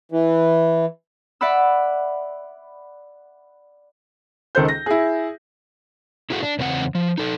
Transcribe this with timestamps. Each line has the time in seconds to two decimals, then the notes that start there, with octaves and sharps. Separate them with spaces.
0.12 E3
1.41 D5 E5 F#5 B5 E6
4.55 C#2 D#3 A4 C5 G6
4.68 A#6
4.86 E4 G#4
6.30 E4 F#4 G#4 A4 F#5
6.43 D4
6.59 E2 C#3 C4 D4 F#5
6.95 F3
7.18 D#4 A4